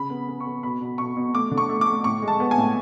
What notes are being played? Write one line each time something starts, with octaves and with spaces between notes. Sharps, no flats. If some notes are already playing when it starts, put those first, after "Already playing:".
Already playing: C#3 B5
B3
B3
C#6
B3
B2 B5
B2
B2 C#6
B2
A3 D6
D3
C#6
A3
D6
A3
A2 C#6
G#3
A5
B3
G#5
A2